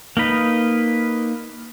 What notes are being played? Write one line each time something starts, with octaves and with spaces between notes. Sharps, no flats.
A#3 D#4 B4 D#5